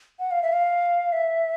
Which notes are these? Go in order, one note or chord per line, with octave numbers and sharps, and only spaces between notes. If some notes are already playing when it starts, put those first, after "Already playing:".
F#5
F5
E5
F5
E5